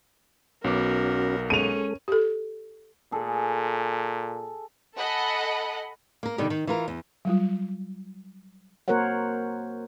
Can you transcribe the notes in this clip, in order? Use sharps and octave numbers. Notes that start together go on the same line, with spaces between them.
B1 B3 C#4 F#4 A#4 D6
G#3 C#4 A4 D#7 F7
G4 A4
A#2 G#4 A4
A4 D#5 F#5 G#5 B5
A#3 A#4
B2 D3 D#3 G3 G4
D#3
E3 F4 A#4
E2
F#3 G3 F4
A#3 F#4 A#4 C5 C#5 F#5